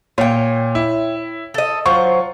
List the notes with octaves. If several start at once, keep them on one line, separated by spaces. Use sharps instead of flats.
A#2 C#5 G5
E4
A4 D#5
F#3 F4 C5 C#6